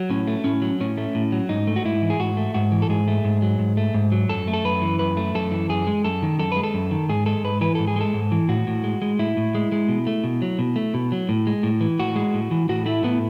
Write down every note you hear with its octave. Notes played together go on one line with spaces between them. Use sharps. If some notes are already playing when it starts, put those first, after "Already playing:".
Already playing: F#3
A2 C#4
A3
A2 C#4
F#3
A2 C#4
A3
A2
F#3
G#2 D#4
A3
F#4
G#2 E4
E3
G#4
G#2 F#4
A3
G#2 F#4
E3
A4
G#2 G#4
A3
G#2
F#3
G#2
A3
G#2
F#3
F#2 A4
A3
A4
F#2 B4
E3
F#2 B4
A3
F#2 A4
E3
F#2 G#4
G#3
F#2 A4
D#3
F#2 A4
G#3 B4
A4
F#2
D#3
G#2 G#4
G#3 A4
G#2 B4
E3 B4
G#2 A4
G#4
G#3 A4
G#2
E3
A2 F#4
A2
G#3
G#3
A2 E4
A2
G#3
G#3
B2
A3
B2
F#3
B2
A3
B2
F#3
A2
G#3
A2
E3
A2 F#4
G#3
A2
E3
A2 F#4
A3 E4
A2 B3